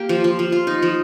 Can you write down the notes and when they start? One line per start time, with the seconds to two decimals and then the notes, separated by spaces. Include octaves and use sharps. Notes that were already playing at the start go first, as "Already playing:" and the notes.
Already playing: A#3 G4
0.09 F3
0.24 F3
0.39 F3
0.52 F4
0.67 D#4
0.82 F3